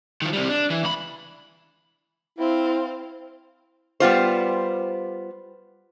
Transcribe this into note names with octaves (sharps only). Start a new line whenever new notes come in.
D#3 F3
C3 G3
D4
E3
C#2 B5
C4 E4 F5
G3 B3 F4 C5